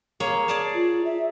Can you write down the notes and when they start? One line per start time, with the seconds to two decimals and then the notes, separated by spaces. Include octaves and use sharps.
0.20 A#3 G#4 C#5
0.48 G#4 D5 A5
0.75 F4
1.05 E5